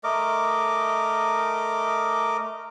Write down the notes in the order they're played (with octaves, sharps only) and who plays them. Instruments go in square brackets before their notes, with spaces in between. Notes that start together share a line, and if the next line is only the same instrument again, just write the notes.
[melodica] A3 A#4 D#5 D6